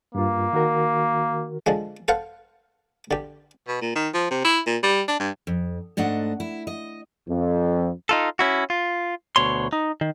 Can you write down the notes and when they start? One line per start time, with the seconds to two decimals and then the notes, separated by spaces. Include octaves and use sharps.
0.15 G2 A#3 F4
0.53 D#3 F#4 A#4
1.66 D3 F3 G#3
2.08 A4 C5 F5 F#5
3.11 D3 G4
3.68 B2
3.82 A#2
3.95 D#3
4.14 F3
4.31 C3
4.44 E4
4.67 A#2
4.83 G3
5.08 D4
5.19 G2
5.47 F2
5.97 G#2 A3 D4 D#5 F#5
6.40 E4
6.67 D#5
7.28 F2
8.09 D#4 F4 A4
8.39 C#4 E4 F#4
8.70 F4
9.36 D2 B2 C#5 C6
9.73 D#4
10.01 D#3